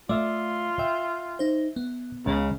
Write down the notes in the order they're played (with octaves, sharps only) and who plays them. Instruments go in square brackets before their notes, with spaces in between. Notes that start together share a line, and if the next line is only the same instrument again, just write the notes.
[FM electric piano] A3 [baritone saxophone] F4 [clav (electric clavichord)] D5 E5 F5
[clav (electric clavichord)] E5 [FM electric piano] G5
[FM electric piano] D#4 C5
B3
[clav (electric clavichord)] C#2 [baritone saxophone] C#3